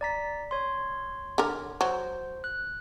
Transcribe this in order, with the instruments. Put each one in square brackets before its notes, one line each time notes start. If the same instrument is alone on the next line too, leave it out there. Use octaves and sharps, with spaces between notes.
[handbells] D5 A#5 B6
C#5 C6
[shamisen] D3 A#4
[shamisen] F#3 [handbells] C5
[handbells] F#6